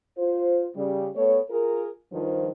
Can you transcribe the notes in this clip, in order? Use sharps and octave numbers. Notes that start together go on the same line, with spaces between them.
F4 C5
C#3 G3
A3 B3 A4 C#5
F4 G#4 A#4
G2 D#3 F3